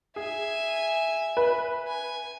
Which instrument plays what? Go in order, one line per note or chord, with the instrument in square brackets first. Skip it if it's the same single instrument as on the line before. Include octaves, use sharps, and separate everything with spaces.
[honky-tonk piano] G#4 [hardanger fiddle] E5 G#5
[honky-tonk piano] B4
[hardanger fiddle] G#5